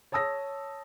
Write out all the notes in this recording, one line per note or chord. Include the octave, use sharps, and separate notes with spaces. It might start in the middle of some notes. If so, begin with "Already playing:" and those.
C#5 A5 D#6 E6 A#6